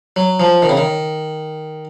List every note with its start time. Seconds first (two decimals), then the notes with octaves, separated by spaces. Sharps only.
0.16 F#3
0.40 F3
0.62 D#3
0.69 C#3
0.77 D#3